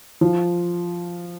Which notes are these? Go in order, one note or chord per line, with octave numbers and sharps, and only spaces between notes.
F3